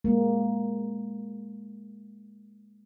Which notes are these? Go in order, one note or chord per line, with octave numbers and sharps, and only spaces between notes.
G#3 A#3